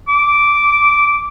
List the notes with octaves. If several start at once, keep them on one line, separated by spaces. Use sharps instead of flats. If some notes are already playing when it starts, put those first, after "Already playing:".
D6